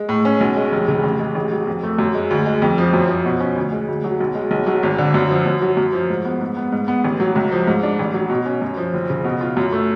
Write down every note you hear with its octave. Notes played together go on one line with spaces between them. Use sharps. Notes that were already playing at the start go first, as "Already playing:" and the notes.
Already playing: G#3
A2
C#4
B1
G#3
F1
C#3
A1
G#3
A1
F#3
F2
A3
F#2
G#3
D2
G#3
F2
F3
F#2
F3
B2
C#4
D2
G#3
D2
F#3
B1
G#3
B1
F#3
G#1
D3
F#2
F3
F#2
F#3
F#2
F3
G#2
B3
G#2
B3
G#2
B3
A1
F#3
C#2
F3
G#2
D4
A1
F#3
B2
C#4
F#2
F3
F#1
C#3
B2
F4
F#2
A3